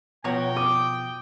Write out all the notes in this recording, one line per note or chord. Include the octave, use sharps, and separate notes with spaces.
B2 F3 B3 F#4 C#5 G5 A#5
D6 D#6